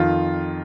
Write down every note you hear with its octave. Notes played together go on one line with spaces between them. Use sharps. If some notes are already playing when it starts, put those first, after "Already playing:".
Already playing: F2 D#3 F4